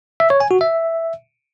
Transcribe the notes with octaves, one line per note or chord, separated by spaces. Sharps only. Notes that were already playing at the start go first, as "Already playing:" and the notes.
E5
C#5
G#5
F#4
E5